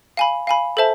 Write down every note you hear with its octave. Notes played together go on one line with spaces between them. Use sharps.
F5 G#5 B5
F5 G#5 B5
A4 C5 E5 A5